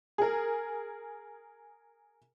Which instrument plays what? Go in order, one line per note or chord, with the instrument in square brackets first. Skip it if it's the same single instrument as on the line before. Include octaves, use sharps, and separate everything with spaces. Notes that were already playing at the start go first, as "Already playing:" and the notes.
[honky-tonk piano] G#4 A#4